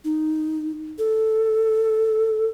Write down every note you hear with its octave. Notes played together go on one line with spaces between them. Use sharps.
D#4
A4